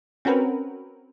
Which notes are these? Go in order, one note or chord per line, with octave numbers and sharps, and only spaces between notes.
C4 C#4 F#4 A#4 B4